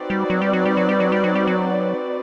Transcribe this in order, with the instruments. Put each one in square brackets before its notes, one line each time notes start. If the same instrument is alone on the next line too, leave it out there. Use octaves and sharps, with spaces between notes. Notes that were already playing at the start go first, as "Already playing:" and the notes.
Already playing: [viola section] C4 D#4 F#4 B4 D5
[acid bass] G3
F#3
G3
F#3
G3
F#3
G3
F#3
G3
F#3
G3
F#3